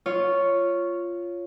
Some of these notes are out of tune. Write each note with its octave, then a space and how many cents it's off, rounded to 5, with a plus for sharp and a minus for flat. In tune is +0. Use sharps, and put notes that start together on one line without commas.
F4 -10 C#5 +0